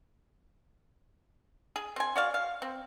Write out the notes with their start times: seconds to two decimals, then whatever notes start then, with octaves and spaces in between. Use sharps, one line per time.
1.76 G#4
1.96 C4 G#5
2.16 F#4 D5 F5
2.34 F5
2.62 C4